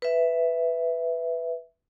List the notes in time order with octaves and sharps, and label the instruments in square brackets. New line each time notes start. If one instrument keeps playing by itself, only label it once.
[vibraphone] B4 E5